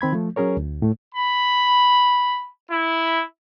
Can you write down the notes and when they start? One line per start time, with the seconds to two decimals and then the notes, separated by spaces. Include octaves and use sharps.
0.01 D#3 C4 B5 G#6
0.13 F3 A3
0.36 F#3 C#4 G#4 A#4 C#5
0.57 D2
0.82 A2 A3
1.15 B5
2.71 E4